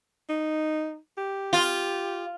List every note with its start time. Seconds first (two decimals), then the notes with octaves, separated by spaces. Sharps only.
0.30 D#4
1.17 G4
1.53 F4